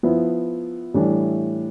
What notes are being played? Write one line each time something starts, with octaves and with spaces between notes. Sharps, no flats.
F3 B3 E4
A2 E3 G3 D4